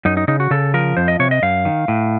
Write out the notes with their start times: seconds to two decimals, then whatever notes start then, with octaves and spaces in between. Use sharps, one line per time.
0.05 F#2 D#4
0.17 D#4
0.28 C#3 D#4
0.40 F#4
0.51 C#3 A4
0.74 F3 A#4
0.97 F2 C5
1.08 D#5
1.19 C3 C#5
1.31 D#5
1.42 F#2 F5
1.65 D#3
1.88 A2